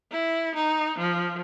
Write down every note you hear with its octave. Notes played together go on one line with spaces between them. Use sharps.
E4
D#4
F3